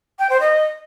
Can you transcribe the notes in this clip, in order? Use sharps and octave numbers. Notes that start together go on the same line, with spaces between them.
G5
C5
D#5